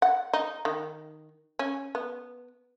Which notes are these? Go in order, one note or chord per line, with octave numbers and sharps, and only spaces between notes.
F#5
D#4
D#3
C#4
B3